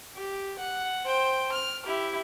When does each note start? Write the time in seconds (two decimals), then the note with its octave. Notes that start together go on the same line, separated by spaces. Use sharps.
0.16 G4
0.58 F#5
1.05 C5 G5
1.52 F6
1.85 E4 G4